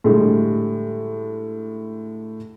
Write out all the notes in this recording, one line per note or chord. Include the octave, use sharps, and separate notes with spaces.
A2 D3 G3 G#3